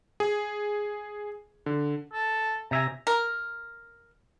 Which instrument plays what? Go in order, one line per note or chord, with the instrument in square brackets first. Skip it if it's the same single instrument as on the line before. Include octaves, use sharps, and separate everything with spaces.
[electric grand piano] G#4
D3
[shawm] A4
[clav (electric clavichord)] C3 E5 G#5 [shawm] A#5
[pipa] A#4